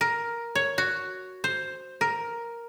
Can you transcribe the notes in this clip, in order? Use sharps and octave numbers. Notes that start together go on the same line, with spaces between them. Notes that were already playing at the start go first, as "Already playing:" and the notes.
A#4
C#5
F#4
C5
A#4